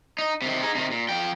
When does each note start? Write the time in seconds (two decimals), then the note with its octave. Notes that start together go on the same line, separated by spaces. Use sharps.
0.19 D#4
0.42 C3 D#3
0.63 D#4 G#4
0.75 C3 D#3
0.91 A#2
1.09 F3 G5